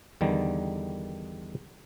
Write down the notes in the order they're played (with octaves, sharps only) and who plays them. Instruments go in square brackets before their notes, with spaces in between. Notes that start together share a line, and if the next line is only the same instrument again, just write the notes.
[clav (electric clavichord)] E2 D3 D#3 G3